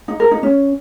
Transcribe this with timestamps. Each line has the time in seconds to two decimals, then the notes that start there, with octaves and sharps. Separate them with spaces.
0.08 D#4
0.20 A#4
0.31 D#4
0.43 C#4